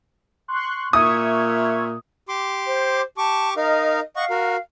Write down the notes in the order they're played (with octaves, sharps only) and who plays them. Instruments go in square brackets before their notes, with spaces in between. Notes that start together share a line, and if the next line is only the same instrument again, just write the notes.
[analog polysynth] C6 C#6 F#6
[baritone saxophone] A#2 [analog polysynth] E5 C#6 G#6 [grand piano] D#6
[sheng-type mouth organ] G4 C6 D6
[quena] C5
[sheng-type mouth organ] G4 C#6 D6 [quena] A5
[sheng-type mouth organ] D#4 A#4 F5 [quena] D#5
[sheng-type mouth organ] D#5 F#5 C#6 [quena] F5
[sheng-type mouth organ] F#4 A#4